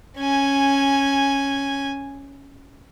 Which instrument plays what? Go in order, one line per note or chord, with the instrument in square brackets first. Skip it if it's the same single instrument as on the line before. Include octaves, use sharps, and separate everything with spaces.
[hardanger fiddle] C#4 G#5